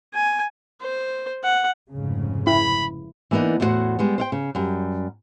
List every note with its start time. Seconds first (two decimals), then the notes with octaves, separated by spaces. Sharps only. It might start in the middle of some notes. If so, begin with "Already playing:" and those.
0.14 G#5
0.81 C5
1.43 F#5
1.92 F1 G#2 C#3
2.47 E4 B5
3.31 E3 A#3 B3 D4 D#4
3.60 E2 A2 E4 F#4 C5 F#5
3.99 G3 G#3 B3
4.18 C5 F5 G5
4.32 C#3
4.55 F#2 G3